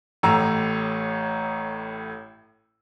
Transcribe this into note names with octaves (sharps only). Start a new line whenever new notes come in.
A1 A2 A#5 E6